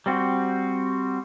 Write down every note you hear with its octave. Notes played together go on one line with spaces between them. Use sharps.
G3 C4 F#4